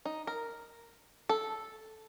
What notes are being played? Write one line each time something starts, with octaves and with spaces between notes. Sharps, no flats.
D#4
A#4
A4